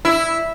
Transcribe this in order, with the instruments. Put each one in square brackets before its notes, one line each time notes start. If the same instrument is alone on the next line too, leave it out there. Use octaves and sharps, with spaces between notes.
[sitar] E4